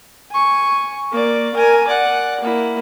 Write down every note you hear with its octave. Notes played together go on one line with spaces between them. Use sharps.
G#5 C#6
A#3 D5
A#4 G#5
D5 F#5
A#3 E4